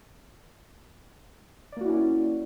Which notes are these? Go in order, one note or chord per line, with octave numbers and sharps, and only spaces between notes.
A#3 C#4 E4 F#4 D5